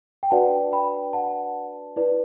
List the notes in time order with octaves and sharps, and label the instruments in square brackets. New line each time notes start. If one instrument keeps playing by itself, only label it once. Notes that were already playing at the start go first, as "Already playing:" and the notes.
[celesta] G5
D4 F#4 B4 D5 F#5 A5
G5 B5
F#5 A5
E4 B4 D5